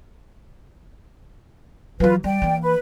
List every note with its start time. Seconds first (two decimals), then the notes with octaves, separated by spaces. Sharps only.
2.00 E3 F#3 F4 B4
2.24 G3 D5 G5
2.42 E3 A#3
2.62 B4